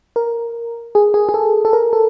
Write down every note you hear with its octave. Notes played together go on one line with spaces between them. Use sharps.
A#4
G#4
G#4
G#4
A4
A4
A#4
A4